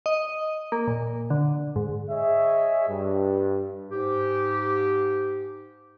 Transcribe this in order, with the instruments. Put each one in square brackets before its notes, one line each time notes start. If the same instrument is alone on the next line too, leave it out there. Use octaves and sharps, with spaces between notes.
[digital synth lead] D#5
A#3
A#2
D3
G#2
[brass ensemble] G#4 C#5 D#5 E5
G2
[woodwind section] G#2 G4